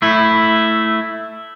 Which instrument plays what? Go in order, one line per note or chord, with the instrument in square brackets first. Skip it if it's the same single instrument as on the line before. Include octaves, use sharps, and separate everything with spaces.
[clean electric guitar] A3 E4